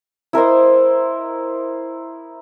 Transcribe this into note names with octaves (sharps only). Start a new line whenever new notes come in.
E4 A#4 C5 D#5